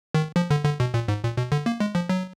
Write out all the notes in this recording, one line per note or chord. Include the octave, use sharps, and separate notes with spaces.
D#3
F3
D3
D3
B2
A#2
G#2
A#2
B2
D3
A#3
G#3
F3
F#3